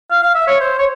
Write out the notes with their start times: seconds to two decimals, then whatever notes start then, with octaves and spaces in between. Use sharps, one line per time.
0.11 F5
0.23 F5
0.35 E5
0.47 C#5
0.61 C5
0.78 C#5